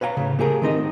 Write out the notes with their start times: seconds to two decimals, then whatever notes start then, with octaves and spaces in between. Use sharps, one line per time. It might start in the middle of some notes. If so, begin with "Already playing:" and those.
0.01 B4 C#5 F5 G5 A#5
0.17 A2 C#3
0.39 A3 G4 G#4 A#4
0.62 D#3 C4 D#4 D#5